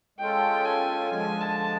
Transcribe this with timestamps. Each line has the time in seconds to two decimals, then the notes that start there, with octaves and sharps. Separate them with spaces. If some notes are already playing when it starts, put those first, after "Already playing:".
0.18 G#3 C#4 F4 A4 G5
0.65 G#5
1.10 D3 F3 G#3 G#5
1.41 A5